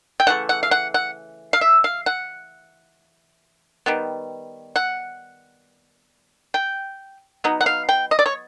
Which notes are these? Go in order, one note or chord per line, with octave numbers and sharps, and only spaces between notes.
G5
C#3 E3 A3 F#5
F#5
F5
F#5
F#5
F5
E5
F5
F#5
D#3 G3 B3
F#5
G5
F#3 B3 D#4
F#5
F5
G5
D#5
D5
C#5